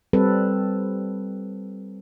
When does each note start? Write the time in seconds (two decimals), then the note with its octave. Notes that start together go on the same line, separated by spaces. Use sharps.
0.13 G3 C4 A4 B4